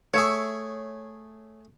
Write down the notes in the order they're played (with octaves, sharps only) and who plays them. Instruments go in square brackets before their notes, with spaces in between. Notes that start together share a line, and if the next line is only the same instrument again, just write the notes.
[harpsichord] A3 G#4 [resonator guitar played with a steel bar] C#5 E5